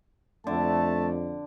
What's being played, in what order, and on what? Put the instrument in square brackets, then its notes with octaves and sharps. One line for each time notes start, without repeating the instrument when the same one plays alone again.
[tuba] F2 [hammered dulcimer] D3 [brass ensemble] A3 [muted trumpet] A5